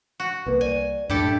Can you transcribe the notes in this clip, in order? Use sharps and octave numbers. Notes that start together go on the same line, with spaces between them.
F#4
C2 A#3 B4
D5 G#5
F#2 A2 A3 D4 E4 G4 A4